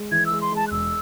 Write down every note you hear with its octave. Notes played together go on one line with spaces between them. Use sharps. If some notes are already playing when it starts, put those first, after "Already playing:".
Already playing: G#3
E3 G#6
E6
G#3
C6
G#3 A5
F#6
E1 E6